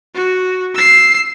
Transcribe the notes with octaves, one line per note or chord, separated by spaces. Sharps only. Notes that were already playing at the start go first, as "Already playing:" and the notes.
F#4
E6 C7